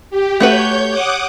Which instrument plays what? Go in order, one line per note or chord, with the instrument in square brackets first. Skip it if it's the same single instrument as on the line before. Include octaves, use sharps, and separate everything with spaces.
[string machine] G4
[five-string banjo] A3 F#4 B4 [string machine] C#5 G6
[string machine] F#5 D6 D#6